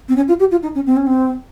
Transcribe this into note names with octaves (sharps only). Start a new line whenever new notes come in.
C4
C#4
F4
G4
F4
D#4
C#4
C4
C#4
C4